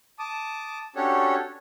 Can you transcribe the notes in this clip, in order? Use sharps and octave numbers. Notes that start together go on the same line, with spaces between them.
A5 D6 D#6
C#4 D4 F#4 G4 A4 C#5